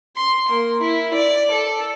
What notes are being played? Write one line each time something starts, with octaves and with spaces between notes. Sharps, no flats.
C6
A#3
E4
D5
A4